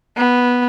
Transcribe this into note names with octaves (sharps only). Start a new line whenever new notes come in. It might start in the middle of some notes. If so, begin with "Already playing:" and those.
B3